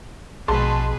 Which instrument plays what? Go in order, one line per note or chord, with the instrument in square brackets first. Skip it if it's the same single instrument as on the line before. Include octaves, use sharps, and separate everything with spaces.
[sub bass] A#1 [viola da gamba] B2 G#4 B4 [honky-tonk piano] G#3 A5 C6